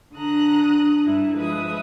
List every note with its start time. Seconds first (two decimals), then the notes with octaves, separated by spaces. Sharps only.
0.15 D3 D4 A#5 D#6 F#6
1.04 G2 G3 E4
1.36 F3 G#3 B4 E5 D#6